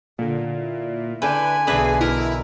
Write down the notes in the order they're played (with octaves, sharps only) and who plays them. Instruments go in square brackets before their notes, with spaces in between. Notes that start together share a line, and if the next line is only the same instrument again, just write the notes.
[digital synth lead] A#2 [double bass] D3
[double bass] E4
[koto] D3 G5 [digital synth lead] B4 [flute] G#5
[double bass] B1 B2 [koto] D3 E3 B4 [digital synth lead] G#4
[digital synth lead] E4 [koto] A#4